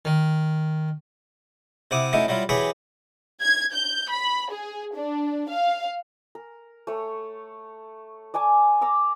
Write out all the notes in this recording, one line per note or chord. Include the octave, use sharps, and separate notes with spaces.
D#3
C3 E4 F#5 D6 D#6
F#3 A3 C#4 D#4 E4
F#3 G3 E4 F4
E3 F#3 G4 G#4 B5 C#6
G#6
G6
B5
G#4
D4
F5
A#4
A3 C#5
D5 G#5 A5 D6
A#5 D6 E6